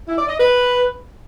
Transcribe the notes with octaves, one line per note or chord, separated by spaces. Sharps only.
E4
D5
D#5
B4